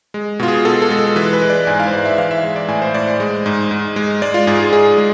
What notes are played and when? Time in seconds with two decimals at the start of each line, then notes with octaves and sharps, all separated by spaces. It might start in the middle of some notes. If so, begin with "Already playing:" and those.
0.14 G#3
0.39 B2 F4
0.48 G#4
0.65 B2 A4
0.82 A4
0.90 G#3
0.99 A4
1.16 E3 B4
1.33 B4
1.42 G#3
1.50 D5
1.67 G#2 G#5
1.80 F5
1.87 C5
1.93 G#2 D5
2.05 E5
2.18 E3 F5
2.31 E5
2.44 G#3
2.56 D5
2.68 A2 G#5
2.82 C5
2.94 A2 D5
3.07 C5
3.20 G#3
3.46 G#2
3.71 G#2
3.96 G#3
4.22 G#3 D5
4.34 F4
4.47 G#2 G#4
4.60 G#4
4.73 G#2 G#4
4.98 G#3